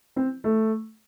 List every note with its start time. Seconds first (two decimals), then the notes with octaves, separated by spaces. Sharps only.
0.16 C4
0.44 A3